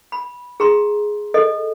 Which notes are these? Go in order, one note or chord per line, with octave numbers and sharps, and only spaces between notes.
B5
G#4 A#5 C6
A4 D#5